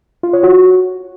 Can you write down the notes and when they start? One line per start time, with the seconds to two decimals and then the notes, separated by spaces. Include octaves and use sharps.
0.23 F4
0.33 C#5
0.43 F#4